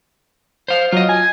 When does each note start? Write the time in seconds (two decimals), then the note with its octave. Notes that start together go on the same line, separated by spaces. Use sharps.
0.68 C5 F5
0.92 F#3 F4 D#5
1.09 G#5